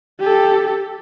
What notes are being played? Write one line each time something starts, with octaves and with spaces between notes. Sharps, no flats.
G4 A4